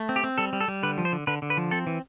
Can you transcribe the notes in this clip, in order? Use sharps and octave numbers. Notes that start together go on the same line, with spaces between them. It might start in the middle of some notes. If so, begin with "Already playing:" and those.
Already playing: A3
C4
G4
C4
G3 A4
G3
A4
G3
D3 B4
F3
C5
D3
D3 B4
D3
B4
F3
C4 A4
E3